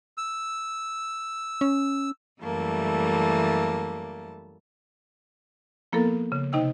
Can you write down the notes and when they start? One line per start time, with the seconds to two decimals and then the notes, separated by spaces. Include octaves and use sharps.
0.17 E6
1.61 C#4
2.41 F#2 E3 G3 A3 A#3 A5
5.93 F3 A#3 B3 E4 A4 A#4
6.32 C#3
6.53 C3 D#4 D#5 G5 E6